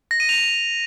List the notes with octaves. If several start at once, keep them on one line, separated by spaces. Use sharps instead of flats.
A#6
D#7
F7